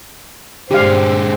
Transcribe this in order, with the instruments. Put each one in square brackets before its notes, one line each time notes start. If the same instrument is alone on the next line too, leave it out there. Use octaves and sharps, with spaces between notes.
[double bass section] G2 A#2 [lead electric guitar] D3 G#3 [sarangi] C4 [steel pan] G4 F5